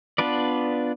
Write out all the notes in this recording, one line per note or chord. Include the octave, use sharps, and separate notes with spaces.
B3 D4 F4 B4 D5